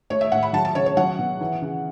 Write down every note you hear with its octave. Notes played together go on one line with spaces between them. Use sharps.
A3 C#5
E5
A2 F#5
B5
F#3 A5
A5
C#3 C#5
C#5
F#3 F#5
B2
E3
C#3